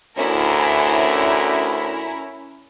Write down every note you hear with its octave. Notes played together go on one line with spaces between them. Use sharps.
D2 C#4 E4 A#4